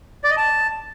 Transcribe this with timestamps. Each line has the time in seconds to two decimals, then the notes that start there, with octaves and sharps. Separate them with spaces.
0.24 D5
0.30 D#5
0.37 A5